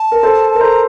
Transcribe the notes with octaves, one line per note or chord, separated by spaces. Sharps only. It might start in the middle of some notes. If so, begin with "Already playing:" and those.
Already playing: A5
A#4
A4 C5
A#4
A4 C5 A#5